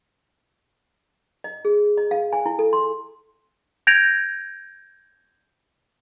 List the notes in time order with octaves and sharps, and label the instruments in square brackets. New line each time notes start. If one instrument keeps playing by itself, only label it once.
[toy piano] D#5
G#4
D#5
F5
G#5
E4
A4
C6
[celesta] G6 G#6 A#6 D7 F7